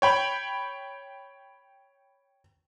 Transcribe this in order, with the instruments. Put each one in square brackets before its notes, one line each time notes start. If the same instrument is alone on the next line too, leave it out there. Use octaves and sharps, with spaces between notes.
[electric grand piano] C#5 G5 B5